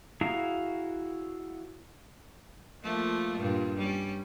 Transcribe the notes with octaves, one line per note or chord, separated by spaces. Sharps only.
E4 F#4 G#4 F5 A#5
F3 A3 A#3
G2 A#2
G3 C#4